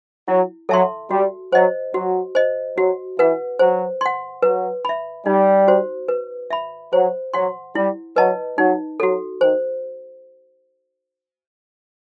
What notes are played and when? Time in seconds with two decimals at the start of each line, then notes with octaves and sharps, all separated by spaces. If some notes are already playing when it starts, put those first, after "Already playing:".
0.28 F#3 E4
0.69 F#3 A4 E5 A5 C6
1.11 G3 F#4
1.52 F#3 C5 D#5
1.94 F#3 F#4
2.35 C5 D#5
2.77 F#3 F#4
3.19 E3 B4 F#5
3.59 F#3 C5
4.01 F#5 C6
4.43 F#3 B4
4.85 E5 B5
5.26 G3 D#4
5.68 F#4 C5
6.08 B4
6.50 E5 B5
6.92 F#3 C5
7.34 F#3 F#5 C6
7.75 G3 E4
8.16 F#3 B4 D#5 A5
8.58 F#3 D#4
9.00 F#3 F#4 A4
9.41 D#3 C5